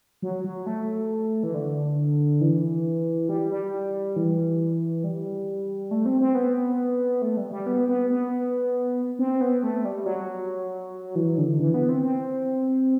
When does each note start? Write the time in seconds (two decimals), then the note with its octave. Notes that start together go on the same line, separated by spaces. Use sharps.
0.22 F#3
0.44 F#3
0.66 A3
1.43 E3
1.54 D3
2.41 E3
3.29 G3
3.51 G3
4.16 E3
5.04 G3
5.91 A3
6.06 C4
6.20 C4
6.35 B3
7.22 A3
7.37 G3
7.51 G3
7.66 B3
7.88 B3
8.10 B3
9.19 C4
9.41 B3
9.63 A3
9.85 G3
10.06 F#3
11.15 E3
11.38 D3
11.59 E3
11.74 B3
11.89 C4
12.03 C4